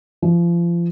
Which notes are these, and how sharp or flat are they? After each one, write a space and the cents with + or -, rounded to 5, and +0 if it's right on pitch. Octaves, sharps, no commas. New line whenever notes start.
F3 -30